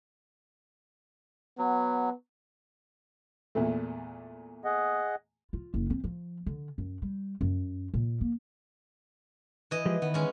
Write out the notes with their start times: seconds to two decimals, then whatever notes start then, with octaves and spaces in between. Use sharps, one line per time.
1.58 F#3 B3
3.55 E2 A#2 A3
4.65 G#4 D#5 F#5
5.53 F4
5.74 F#1
5.90 C4
6.04 F3
6.46 D3
6.78 F#2
7.02 G3
7.41 F#2
7.94 A#2
8.21 A#3
9.71 E3 D#5
9.86 F3 G#3 G4
10.02 D#3 B3
10.14 G#3 C#4